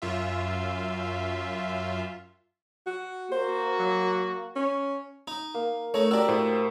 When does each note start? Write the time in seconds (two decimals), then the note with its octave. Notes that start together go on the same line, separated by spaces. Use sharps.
0.02 F#2 F4 E5
2.86 F#4
3.32 A#3 F#4 C5
3.79 F#3
4.56 C#4
5.28 D#4
5.54 A#3
5.94 A3 D#4 C#5 D#5
6.11 D4 F#4 G4 A#4 D5 E6
6.28 A2 C5